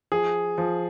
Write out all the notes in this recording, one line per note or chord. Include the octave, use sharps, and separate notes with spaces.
F3 G#4
F3